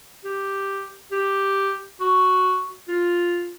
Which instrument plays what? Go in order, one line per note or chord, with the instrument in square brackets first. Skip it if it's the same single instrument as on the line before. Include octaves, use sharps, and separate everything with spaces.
[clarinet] G4
G4
F#4
F4